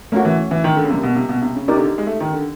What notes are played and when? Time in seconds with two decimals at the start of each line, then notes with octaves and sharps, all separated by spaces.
0.12 A3 A#3 C#4 F#4
0.25 E3
0.51 E3
0.64 D#3
0.76 D3
0.84 C#3
0.89 C3 G3 A#3 D4
1.03 B2
1.16 C3
1.29 B2
1.42 C3
1.55 C#3
1.68 C3 D#4 G4 A#4 D5
1.77 D3
1.98 G#3
2.06 A3
2.20 D#3
2.33 D3